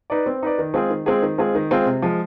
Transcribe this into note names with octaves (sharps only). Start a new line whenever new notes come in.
D#4 B4 D5
C4
D#4 B4 D5
D#3
G#3 C4 F4 G#4
D#3
G#3 C4 F4 G#4
D#3
G#3 C4 F4 G#4
D#3
G#3 C4 F4 G#4
C3
F3 G#3